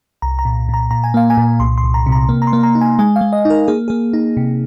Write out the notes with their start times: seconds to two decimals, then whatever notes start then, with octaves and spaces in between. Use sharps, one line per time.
0.22 C2 A#5
0.39 A#5
0.45 A#2
0.69 A#2 A#5
0.91 A#2 A#5
1.04 G#5
1.14 A#3 F5
1.30 G#5
1.37 A#2
1.60 C2 C6
1.78 C6
1.84 C2
1.94 A#5
2.06 C3
2.12 A#5
2.29 A#3
2.42 A#5
2.47 C6
2.53 A#3
2.63 A#5
2.75 D#4
2.81 G#5
2.99 G#3 G#5
3.16 F5
3.21 G#3
3.33 D#5
3.45 D#4
3.50 A#4
3.68 A#3 G#4
3.88 A#3 G#4
4.13 D#4
4.37 C3